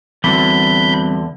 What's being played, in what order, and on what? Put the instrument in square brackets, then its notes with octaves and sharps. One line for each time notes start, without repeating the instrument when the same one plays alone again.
[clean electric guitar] E2 D3 [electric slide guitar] G3 C4 F#4 [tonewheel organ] B5 G6